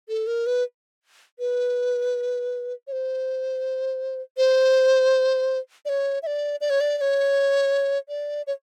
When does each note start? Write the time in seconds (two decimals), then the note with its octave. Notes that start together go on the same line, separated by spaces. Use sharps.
0.09 A4
0.27 A#4
0.46 B4
1.39 B4
2.87 C#5
2.92 C5
4.37 C5
5.85 D5
5.89 C#5
6.23 E5
6.27 D5
6.61 D5
6.70 C#5
6.80 D5
6.98 D5
7.01 C#5
8.09 D5
8.47 C#5